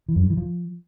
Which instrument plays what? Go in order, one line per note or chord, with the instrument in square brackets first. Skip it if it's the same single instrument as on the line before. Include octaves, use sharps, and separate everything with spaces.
[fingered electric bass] E3
F#2
G2
E3
F3